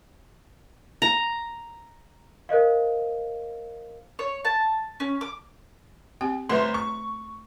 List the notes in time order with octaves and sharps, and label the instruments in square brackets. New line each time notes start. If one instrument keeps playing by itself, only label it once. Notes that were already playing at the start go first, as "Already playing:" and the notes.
[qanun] A#5
[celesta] A#4 C5 D#5 F5
[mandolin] C#5
A5
C#4
D6
[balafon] C4 G4 G5
[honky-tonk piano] G1 C5 C6 [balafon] A3 B4 E5
[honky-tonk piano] C#6